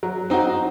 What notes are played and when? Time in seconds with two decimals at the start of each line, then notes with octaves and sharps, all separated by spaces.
0.03 F#3
0.30 C4 D#4 F#4